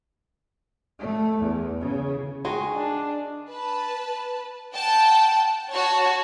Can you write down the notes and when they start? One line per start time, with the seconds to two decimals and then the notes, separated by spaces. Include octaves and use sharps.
0.99 A3
1.42 E2
1.81 C#3
2.45 D#3 G#3 F#4 G#4
2.76 D4
3.49 B4 A5
4.73 F#5 G5 A5
5.69 F#4 C#5 A5